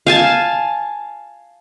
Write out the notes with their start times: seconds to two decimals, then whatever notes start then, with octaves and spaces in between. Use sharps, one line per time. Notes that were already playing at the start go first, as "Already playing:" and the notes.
0.07 F5 G#5 A5